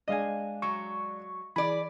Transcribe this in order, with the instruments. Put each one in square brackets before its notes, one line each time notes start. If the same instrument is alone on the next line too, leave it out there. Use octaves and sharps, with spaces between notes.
[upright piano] G#3 D4 [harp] D#5 F5 G#5
[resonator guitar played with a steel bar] F#3 [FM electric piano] C#6
[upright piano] E3 [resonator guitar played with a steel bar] G#4 D5 [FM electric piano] B5